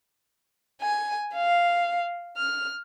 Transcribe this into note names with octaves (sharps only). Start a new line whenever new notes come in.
G#5
F5
F6